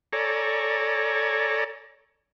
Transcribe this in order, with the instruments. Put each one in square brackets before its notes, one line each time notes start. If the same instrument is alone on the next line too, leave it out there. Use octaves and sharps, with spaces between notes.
[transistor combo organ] A4 C#5 D5 G#5 A#5